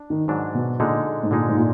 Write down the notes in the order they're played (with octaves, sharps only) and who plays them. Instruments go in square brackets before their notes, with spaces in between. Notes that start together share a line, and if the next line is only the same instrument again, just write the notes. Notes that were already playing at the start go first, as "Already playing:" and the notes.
Already playing: [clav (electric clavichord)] D4
[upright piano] D#3
[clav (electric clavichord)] G#2 F#3 D4
[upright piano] B2
[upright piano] A#2 [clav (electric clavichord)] D3 G#3 D#4
[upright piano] G#2
[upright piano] A#2 [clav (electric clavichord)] D3 G#3 D#4
[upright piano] G#2
A#2